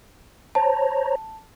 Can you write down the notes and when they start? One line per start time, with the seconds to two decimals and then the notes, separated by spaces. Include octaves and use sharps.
0.55 C5 C#5 A5 A#5